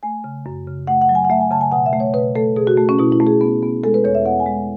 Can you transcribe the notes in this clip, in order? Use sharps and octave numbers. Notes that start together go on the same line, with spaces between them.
A3 G#5
C#3
F#2
C#3
A3 F#5
F#5
F#3
G#5
F#5
A3 E5
G#5
C#3 A5
G#5
B2 F#5
E5
A3
C#5
B2 B4
A3 A4
B2 G#4
F#4
A3
C#4
B2 E4
E4
A3
G#4
B3
B3
G#3 A4
B4
E2 C#5
E5
B3 F#5
G#5
G#3